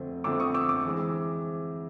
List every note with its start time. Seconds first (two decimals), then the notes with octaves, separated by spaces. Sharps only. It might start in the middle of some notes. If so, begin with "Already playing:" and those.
Already playing: F2 D3 F3 A3 C4
0.24 F2 D3 F3 A3 C4 D6 E6
0.40 C#6 D#6
0.54 D6 E6
0.69 D6 E6
0.86 E3 G#3 C4